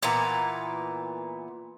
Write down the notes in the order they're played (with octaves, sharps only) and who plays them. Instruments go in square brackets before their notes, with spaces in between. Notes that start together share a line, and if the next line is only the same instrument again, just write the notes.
[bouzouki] A#2 E3 B3 A#5